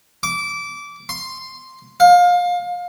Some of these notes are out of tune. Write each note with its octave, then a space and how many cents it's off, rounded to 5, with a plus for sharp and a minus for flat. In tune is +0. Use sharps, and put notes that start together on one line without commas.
D6 -20
C6 +0
F5 +25